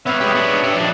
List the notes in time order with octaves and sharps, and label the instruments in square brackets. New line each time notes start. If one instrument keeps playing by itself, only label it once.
[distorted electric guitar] B3 F5 [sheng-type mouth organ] B4 C#5 E5
[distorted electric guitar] G#3 G4
B3 D4
D4 G4
[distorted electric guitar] F2 D4 [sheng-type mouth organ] B4